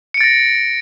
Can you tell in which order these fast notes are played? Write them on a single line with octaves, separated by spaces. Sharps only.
C#7 D7 A6 A#6